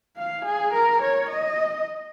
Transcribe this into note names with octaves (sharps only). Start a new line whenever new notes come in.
F5
G#4
A#4
C#5
D#5